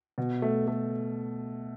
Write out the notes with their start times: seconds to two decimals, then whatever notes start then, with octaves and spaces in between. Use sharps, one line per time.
0.18 B2
0.42 A3
0.68 A3